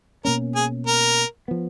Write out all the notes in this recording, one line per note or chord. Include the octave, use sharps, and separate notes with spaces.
B2 A#3 C#4 A#4
G#4
A#4
F3 B3